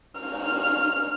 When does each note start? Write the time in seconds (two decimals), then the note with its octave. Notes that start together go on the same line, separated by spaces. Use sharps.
0.20 F6